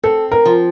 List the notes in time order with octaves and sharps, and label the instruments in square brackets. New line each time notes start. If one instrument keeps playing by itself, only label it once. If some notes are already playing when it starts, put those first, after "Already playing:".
[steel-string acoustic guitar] C4 [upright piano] A4
[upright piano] A#4
[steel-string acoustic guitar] F3